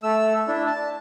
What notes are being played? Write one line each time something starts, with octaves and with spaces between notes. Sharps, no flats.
A3 E6
D4 E4
A5